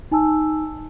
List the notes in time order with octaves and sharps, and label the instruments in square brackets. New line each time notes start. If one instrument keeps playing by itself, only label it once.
[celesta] D#4 G#5 A5 E6